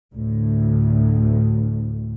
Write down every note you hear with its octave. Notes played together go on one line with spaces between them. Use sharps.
D2 A2